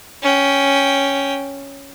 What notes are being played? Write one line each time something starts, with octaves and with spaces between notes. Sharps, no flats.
C#4 G5